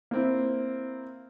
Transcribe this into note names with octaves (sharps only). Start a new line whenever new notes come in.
A#3 C4 E4